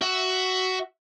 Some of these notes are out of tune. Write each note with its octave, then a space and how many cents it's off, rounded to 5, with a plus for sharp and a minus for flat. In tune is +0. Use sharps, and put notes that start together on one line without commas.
F#4 +10 E5 +0